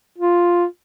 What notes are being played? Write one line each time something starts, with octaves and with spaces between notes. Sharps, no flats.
F4